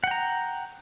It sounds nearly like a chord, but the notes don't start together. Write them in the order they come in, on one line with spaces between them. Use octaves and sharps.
F#5 G5 A#5